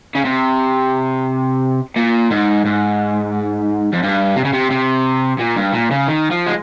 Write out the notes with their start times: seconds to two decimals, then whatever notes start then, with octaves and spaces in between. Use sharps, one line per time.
0.15 C#3
0.25 C3
1.96 A#2
2.31 G#2
2.66 G#2
3.93 F2
4.03 G2
4.36 C3
4.45 C#3
4.53 C3
4.71 C3
5.39 A#2
5.56 G2
5.74 A#2
5.91 C#3
6.08 D#3
6.31 F3
6.47 G#3